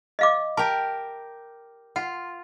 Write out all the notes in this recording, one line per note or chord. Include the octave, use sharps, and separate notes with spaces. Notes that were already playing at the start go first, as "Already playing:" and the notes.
D#5 F5 D6
G4 A#4 A5
F4 F#5